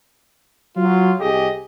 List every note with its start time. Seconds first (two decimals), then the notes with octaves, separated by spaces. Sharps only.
0.76 F#3 F4
1.19 C2 G4 G#4 D#5